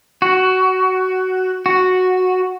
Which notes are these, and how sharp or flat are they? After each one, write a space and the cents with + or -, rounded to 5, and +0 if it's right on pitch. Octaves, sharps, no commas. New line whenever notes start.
F#4 +15
F#4 -5